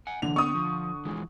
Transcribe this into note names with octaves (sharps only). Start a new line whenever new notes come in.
F#5 G#5
D3 E3 A#3 F7
B3 C4 C#6 D#6
F3
E3 F3 G#3